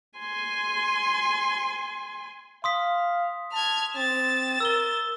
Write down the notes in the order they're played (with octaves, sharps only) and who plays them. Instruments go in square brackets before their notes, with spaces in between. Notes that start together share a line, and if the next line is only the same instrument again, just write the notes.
[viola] G#5 C6
[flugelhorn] F5 [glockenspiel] C6 D#6 B6
[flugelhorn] A5 [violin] F6 G#6
[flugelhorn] C4 [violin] A6 E7
[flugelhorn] A#4 [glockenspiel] E6 G7